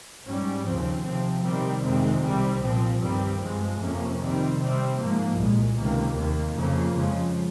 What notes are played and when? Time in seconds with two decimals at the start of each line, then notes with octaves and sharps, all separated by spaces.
0.24 G#2 G3 C#4
0.64 D#2 C#3 F3 C4
1.03 C3 F3 C4
1.43 C3 D#3 G3 C4
1.82 F2 C3 D#3 G#3 C4
2.21 C2 C3 G3 C4
2.61 C2 A#2 F3 C4
3.00 G2 D#3 G3 C4
3.40 G2 F3 G#3
3.79 F2 C3 F3 A#3 C#4
4.19 C3 D#3 G3 C4
4.58 C3 G3 C4
4.98 G#2 F3 A#3
5.37 C2 A#2 G#3
5.76 C#2 C3 D#3 A#3
6.15 D#2 D#3 A#3
6.55 F2 C#3 F3 A#3
6.94 F2 C#3 F3 G#3